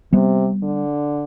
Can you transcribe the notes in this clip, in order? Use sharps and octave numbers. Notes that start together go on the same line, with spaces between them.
C3 G3 B3
D3